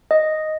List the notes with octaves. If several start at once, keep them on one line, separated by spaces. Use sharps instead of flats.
D#5